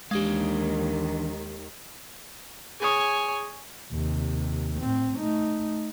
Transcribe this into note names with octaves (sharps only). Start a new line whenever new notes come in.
D#2 D#3 E3 G#3 D4 G4 F5
G#4 C#5 G#5 D#6
D#2 C3
A2 C4
A3 D#4